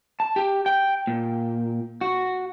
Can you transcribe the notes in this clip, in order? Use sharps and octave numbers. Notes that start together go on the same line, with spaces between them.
A5
G4
G5
A#2
F#4